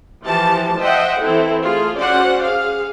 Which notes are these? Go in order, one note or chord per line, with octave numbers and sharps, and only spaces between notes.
E3 F3 G4 A5
C5 D#5 E5 F#5 G5
E3 C4 E4 A4
A3 F4 G#4
C#4 F#4 C5 D5 F#5
G#4 F5